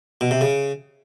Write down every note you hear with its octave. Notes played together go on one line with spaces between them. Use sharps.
B2
C3
C#3